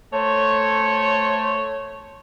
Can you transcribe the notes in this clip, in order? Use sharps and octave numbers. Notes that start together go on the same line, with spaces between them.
A3 C5 C#5